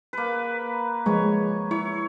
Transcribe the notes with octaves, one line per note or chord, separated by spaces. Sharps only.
A#3 B4
F3 G#3 B4 C#5
E4 C#5